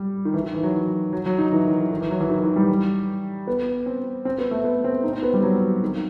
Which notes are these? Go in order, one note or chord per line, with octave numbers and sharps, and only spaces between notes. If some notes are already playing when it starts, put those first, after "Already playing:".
Already playing: G3
D#3
E3
D#3
E3
F#3
F#3
F#3
D#4
E3
D#3
E3
D#3
E3
F#3
E3
D#3
E3
G3
B3
C4
C4
B3
A3
B3
C4
D#4
C4
B3
G3
F#3
D#3